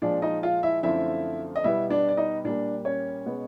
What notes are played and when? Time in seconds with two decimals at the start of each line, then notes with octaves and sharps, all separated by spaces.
0.02 A#2 F3 G#3 D4 D5
0.22 D#4 D#5
0.43 F4 F5
0.63 E4 E5
0.83 F#2 D3 F3 A3 C4 E4 E5
1.56 D#5
1.64 B2 G3 B3 E4 E5
1.90 D4 D5
2.09 D5
2.17 D#4 D#5
2.44 A#2 G3 A#3 D4 D5
2.85 C#4 C#5
3.26 B2 G#3 B3